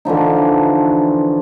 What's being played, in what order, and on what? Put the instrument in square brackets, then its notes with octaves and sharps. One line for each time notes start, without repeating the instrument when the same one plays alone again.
[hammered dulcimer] D3 E3 F3 D#4